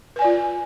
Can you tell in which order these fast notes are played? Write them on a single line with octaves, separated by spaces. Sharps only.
B4 G#5 D5 F4